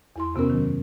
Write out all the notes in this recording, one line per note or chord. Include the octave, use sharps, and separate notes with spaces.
E2 E4 C6
F#2 C3 B3 C#4 A#4
D#3 F#3